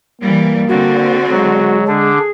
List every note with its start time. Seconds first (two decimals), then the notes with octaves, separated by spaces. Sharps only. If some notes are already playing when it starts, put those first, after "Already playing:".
0.22 E3 G3 A#3
0.69 D3 C4 F#4
1.31 F#3 G#3
1.87 D3 D4 G#4